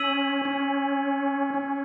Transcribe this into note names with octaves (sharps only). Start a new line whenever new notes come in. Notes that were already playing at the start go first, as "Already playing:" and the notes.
Already playing: C#4 E6 G#6 B6 D#7 F#7
C#4
C#4